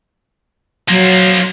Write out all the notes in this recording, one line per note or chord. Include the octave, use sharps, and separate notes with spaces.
F3 F#3 A#3